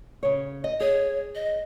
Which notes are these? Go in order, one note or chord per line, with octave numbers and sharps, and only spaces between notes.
C#3 C#5
D#5
G#4 C#5
D#5